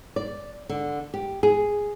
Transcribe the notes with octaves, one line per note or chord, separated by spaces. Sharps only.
D5
D3
G4
G#4